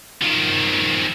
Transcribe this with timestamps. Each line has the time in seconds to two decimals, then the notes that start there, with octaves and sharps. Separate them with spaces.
0.22 D#3 F3